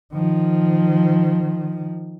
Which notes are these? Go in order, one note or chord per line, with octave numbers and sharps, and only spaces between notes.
D#3 F3